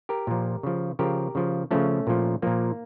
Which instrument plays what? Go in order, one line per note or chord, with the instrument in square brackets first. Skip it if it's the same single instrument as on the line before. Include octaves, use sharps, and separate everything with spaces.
[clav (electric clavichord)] G4 A#4
A#2 F3
C#3 F3
C#3 F3 G4 A#4
C#3 F3
C#3 F3 A3 C#4
A#2 F3
A#2 F3 A#3